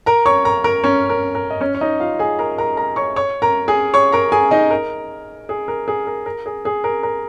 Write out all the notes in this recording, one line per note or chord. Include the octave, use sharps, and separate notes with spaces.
A#4 A#5
C#5 C#6
A#4 A#5
A#4 A#5
C#4 C#5
A#4
A#4
D#5
C#4 C#5
C#5
D#4 D#5
F4 F5
G#4 G#5
A#4 A#5
A#4 A#5
A#4 A#5
C#5 C#6
C#5 C#6
A#4 A#5
G#4 G#5
C#5 C#6
A#4 A#5
G#4 G#5
D#4 D#5
A#4
G#4
A#4
G#4
A#4
A#4
G#4
G#4
A#4
A#4